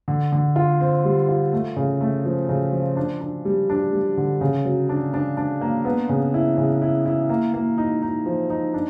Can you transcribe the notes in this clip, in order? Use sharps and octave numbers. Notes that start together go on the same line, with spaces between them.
D3
D3
F4
C4
G3
F4
A3
C#3
A3
F3
C#3
F3
D4
D4
G3
D4
G3
D3
C#3
F#3
D4
D4
D4
A#3
B3
C#3
E4
C#3
E4
E4
A#3
A#3
D#4
D#4
F3
D#4
D4